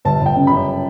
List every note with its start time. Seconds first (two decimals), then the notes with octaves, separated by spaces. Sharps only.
0.05 G1 A5
0.21 G1
0.26 G5
0.36 C#3
0.47 F#2 B5